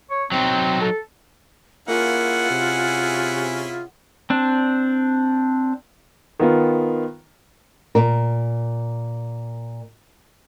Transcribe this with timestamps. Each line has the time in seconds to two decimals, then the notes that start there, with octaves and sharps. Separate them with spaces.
0.10 C#5
0.32 F#3 C4 D#4
0.81 A4
1.88 A#3 C#4 E4 F4 G#4 F#5
2.50 C3
4.30 C4 D4
6.39 D#3 B3 F4
7.95 A#2 A#4